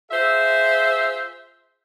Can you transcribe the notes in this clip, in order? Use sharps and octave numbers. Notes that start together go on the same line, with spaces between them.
F4 G#4 C5 E5